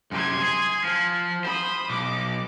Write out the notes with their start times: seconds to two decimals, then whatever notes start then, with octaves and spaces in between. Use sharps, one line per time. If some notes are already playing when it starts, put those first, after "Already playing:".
0.12 F#2 C3 C6 G#6
0.41 G#4
0.84 F3
1.45 C5 B5 D#6
1.90 B1 D6